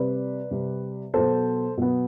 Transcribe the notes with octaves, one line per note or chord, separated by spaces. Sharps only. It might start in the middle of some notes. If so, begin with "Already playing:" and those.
Already playing: C3 G3 C4 B4 D5
C3 G3 C4
B2 F#3 B3 A4 C5
B2 F#3 B3